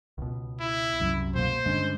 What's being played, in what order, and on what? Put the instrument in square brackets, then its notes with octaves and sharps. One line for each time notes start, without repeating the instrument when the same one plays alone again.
[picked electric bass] C#2 B2
[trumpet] E4
[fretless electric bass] C2 F#2
[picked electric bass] B2 A#3 [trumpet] C5
[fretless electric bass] G2 D3 [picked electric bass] G#3 C#4